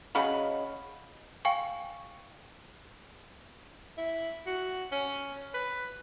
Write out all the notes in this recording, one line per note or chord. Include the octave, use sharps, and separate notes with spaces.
C#3 F#3 D#5 B5
F5 G5 G#5 C#6
E4
F#4
C#4
B4